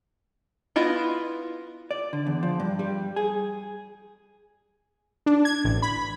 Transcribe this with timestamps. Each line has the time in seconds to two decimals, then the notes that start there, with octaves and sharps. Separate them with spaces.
0.76 B3 E4 F4 D#5
1.91 D5
2.13 D3
2.26 E2
2.43 F3
2.60 G2
2.79 G3
3.16 G#4
5.26 D4
5.45 G#6
5.64 A1
5.82 B5